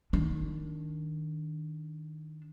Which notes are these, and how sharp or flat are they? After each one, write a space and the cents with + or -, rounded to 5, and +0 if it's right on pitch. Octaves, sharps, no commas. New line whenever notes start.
D#3 +0 D4 -15